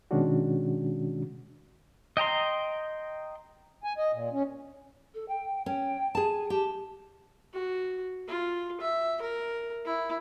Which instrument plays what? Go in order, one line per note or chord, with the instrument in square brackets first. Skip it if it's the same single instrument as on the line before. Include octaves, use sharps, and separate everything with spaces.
[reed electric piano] B2 D#3 G#3 C#4 D4 F#4
[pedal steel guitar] D#5 G5 A#5 C6
[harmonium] G#5
D#5
A#2
C#4
[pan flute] A4
G5
[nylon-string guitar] C#4 [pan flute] G5
[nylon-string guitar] G#4 A5 [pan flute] G#5
[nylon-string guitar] G4 [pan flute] A5
[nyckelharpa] F#4
F4
E5
A#4
E4